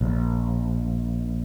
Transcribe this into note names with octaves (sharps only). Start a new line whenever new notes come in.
A#1